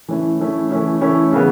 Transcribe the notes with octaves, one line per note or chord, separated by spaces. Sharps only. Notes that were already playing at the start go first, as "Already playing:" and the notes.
E3 A3 C#4 E4
E3 A3 C#4 E4
E3 A3 C#4 E4
E3 A3 C#4 E4
C#3 E3 B3